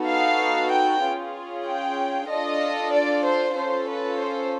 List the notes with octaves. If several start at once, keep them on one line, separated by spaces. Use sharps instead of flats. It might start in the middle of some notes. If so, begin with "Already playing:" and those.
Already playing: B3 D#4 F#4 A4
F5
G5
C#4 F4 G#4
G5
D4 F4 A4 D#5
D5
C5
C#4 F4 A4 C5
B4
C5